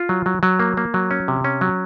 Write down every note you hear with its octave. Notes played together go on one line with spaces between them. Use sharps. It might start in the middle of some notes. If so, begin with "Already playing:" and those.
Already playing: F4
F#3
F#3
F#3
A#3
A#3
F#3
C#4
C3
C#4
F#3